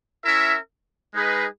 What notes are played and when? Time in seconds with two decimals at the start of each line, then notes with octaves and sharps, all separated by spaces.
0.24 C#4 E4 A#4 E5
1.13 G#3 D#4 G#4 B4